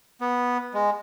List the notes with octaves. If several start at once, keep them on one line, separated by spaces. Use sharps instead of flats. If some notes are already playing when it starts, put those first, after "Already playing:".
B3
G#3